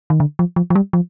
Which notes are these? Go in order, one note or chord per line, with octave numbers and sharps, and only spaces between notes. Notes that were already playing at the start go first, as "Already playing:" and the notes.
D#3
D3
F3
F3
F3
G3
F3